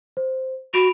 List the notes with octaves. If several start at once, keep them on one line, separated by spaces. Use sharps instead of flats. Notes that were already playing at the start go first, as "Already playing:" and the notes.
C5
F#4 B5 D7 F7